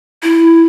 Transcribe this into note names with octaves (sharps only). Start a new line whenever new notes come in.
E4